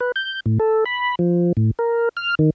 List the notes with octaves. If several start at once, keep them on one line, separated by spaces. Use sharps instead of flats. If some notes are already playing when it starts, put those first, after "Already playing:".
B4
G6
A2
A4
B5
F3
A2
A#4
F6
D#3